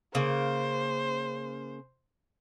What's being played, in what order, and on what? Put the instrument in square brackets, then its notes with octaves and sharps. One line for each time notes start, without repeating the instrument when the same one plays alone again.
[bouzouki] C#3 A#3 [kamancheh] C5